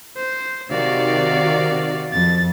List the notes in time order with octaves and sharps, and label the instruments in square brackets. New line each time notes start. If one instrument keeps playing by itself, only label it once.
[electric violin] C5
[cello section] C3 D#3 F#4 [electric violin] D5 F5
[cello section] F2 [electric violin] A6